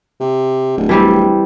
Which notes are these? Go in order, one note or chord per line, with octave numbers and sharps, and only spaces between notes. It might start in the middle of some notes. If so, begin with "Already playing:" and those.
C3
D1
E3 G3 C4